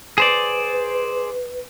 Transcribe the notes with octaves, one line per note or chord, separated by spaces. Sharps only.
G#4 B4 C5 D5